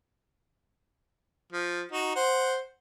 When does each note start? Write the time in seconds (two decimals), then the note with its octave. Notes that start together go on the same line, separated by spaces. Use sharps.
1.52 F3
1.92 D#4 F#4
2.15 C5 F#5